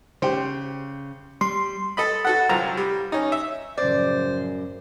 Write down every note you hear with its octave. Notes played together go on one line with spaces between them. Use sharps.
C#3 G4 C5
G3 C6
A4 D#5 B5
F#4 A4 F#5
C2 F#2 F3 F4 A#5
G3
C#4 D#4
E5
F#2 A2 C#3 F3 C5 D5